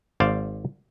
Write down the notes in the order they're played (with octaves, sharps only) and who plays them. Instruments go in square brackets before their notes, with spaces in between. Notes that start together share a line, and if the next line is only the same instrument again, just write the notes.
[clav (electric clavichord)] G#1 C5 D5 F5